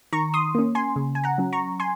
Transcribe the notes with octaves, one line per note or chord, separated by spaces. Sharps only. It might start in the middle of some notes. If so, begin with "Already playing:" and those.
D#3 A#5 C#6
C6 D#6
A#3 C#4
G#5 C6
C#3
G#5
F#5 A#5
F#3 C#4
A#5 C#6
G#5 C6